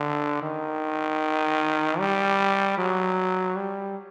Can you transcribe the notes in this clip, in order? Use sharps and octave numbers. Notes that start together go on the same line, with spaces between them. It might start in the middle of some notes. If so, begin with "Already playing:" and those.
Already playing: D3
D#3
G3
F#3
G3